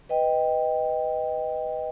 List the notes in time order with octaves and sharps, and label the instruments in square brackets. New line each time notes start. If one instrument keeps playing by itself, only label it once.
[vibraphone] B4 D#5 G5